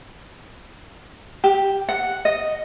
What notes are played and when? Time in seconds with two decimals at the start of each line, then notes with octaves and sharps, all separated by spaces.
1.44 G4
1.89 F#5
2.25 D#5